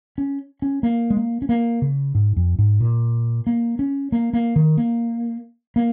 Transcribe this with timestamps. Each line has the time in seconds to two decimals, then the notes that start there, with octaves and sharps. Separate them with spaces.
0.18 C#4
0.62 C#4
0.83 A#3
1.10 G#3
1.17 A#3
1.42 C#4
1.49 A#3
1.82 C#3
2.15 G#2
2.36 F2
2.59 G#2
2.80 A#2
3.47 A#3
3.79 C#4
4.12 A#3
4.33 A#3
4.56 D#3
4.77 A#3
5.76 A#3